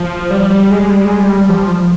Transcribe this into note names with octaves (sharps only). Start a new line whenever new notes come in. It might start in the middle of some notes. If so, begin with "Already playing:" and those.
Already playing: F3
G3
G3
G#3
G3
G#3
G3
G3
F3